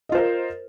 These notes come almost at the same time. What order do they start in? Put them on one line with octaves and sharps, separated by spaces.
D#5 F4 C5 A#4